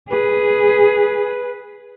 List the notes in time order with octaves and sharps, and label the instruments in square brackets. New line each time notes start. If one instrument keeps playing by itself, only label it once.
[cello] G#4 [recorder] B4